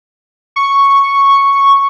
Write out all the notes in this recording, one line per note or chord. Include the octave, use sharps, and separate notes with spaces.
C#6